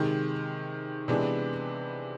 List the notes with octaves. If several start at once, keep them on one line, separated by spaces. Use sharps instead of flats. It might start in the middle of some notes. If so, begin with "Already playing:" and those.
Already playing: C3 D#3 G#3
C3 E3 G#3 B3 D4